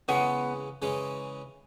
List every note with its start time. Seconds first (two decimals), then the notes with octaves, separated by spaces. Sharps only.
0.08 C#3 E3 G#3 B3 C#4
0.82 C#3 E3 G#3 C#4